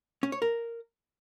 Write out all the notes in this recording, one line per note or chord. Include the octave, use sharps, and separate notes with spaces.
C#4
C#5
A#4